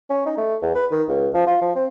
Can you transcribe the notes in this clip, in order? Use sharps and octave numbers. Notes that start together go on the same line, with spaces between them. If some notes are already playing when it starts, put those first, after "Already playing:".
C#4
D#4
A3
E2
B4
D#3
C#2
F3
F4
F3
C4